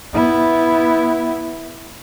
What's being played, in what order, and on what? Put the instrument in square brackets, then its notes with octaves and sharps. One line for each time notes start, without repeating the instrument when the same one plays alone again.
[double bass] B3 E4